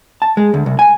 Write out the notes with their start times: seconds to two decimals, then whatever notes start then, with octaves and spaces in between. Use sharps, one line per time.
0.22 A5
0.37 G#3
0.54 D2
0.66 C2
0.79 G#5